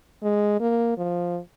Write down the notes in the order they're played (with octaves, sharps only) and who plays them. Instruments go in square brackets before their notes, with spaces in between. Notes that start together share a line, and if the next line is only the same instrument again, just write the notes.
[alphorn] G#3
A#3
F3